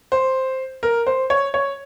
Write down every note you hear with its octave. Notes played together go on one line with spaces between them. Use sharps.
C5
A#4
C5
C#5
C#5